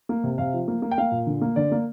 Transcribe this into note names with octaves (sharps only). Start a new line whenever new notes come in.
A#3
C3
C3 F5
F3
A#3
A#3
G5
A#3 F5
A#2
D3
A#3
D3 D5
A#3